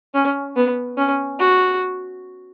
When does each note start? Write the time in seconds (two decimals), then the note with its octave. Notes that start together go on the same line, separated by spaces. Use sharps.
0.14 C#4
0.56 B3
0.98 C#4
1.39 F#4